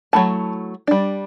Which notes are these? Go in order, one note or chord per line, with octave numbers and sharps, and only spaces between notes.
F#3 A3 E4 A5
G3 D4